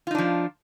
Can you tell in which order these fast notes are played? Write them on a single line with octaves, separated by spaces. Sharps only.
F4 D#4 D4 F3